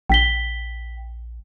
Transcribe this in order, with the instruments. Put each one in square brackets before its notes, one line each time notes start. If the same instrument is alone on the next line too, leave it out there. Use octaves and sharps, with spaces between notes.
[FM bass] A#1 [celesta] G5 B6 G7